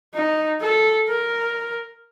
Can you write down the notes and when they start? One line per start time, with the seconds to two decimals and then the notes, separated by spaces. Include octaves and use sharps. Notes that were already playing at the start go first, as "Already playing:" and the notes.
0.15 D#4
0.61 A4
1.08 A#4